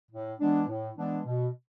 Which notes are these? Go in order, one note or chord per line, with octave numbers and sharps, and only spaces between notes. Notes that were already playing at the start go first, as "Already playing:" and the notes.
A2
E3 G#3 B3 D4
A2
E3 G#3 B3 D4
B2